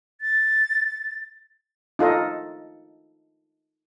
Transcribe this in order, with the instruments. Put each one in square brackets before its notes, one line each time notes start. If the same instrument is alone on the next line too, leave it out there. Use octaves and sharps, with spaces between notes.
[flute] A6
[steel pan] D#4 F4 A4 D#5